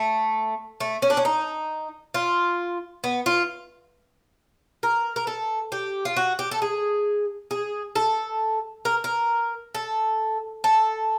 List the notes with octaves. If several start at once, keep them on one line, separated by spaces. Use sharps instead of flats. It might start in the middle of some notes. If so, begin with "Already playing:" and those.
Already playing: A3
A3
C#4
D4
C#4
D#4
F4
B3
F4
A#4
A#4
A4
G4
F4
F#4
G4
A4
G#4
G#4
A4
A#4
A#4
A4
A4